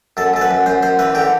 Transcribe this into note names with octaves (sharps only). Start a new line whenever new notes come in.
F#2 A4
F#2 A4
B4
F#2
F#2 C5
F#2 C5
E3 B4
D3 G4